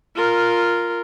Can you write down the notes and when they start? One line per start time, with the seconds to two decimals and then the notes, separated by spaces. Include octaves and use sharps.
0.16 F4 A#4